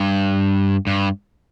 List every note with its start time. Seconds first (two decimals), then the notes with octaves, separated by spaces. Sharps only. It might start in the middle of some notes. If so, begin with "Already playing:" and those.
Already playing: G2
0.87 G2